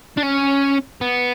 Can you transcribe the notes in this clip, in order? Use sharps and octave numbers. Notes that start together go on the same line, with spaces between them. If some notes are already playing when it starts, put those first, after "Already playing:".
D4
C#4
B3